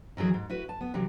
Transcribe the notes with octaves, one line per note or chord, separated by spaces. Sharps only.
D#3 E3 F#3 G#4
G#2
E4 F#4 B4
A5
B3
C3 E3 F#3